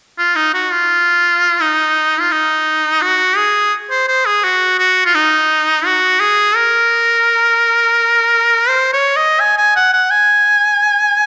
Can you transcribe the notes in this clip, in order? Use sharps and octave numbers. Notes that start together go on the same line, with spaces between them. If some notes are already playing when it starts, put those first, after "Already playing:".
F4
D#4
F#4
F4
D#4
F4
D#4
F#4
G#4
C5
C5
G#4
F#4
F#4
F4
D#4
F#4
G#4
A#4
C5
C#5
D#5
G#5
G#5
F#5
F#5
G#5